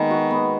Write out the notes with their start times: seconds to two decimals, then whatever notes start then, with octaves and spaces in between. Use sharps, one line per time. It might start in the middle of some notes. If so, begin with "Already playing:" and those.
Already playing: D#3 G#3 B3
0.11 F#4
0.31 B3